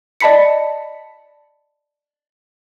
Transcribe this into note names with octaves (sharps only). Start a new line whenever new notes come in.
D5 D#5 A5 B5 B6 C#7